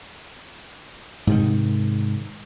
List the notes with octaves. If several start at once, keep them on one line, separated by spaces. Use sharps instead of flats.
G#2 C3 D#3